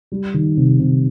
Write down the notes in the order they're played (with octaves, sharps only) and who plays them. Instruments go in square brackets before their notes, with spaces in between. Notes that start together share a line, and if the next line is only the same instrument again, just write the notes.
[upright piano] G3
D#3
C3
C3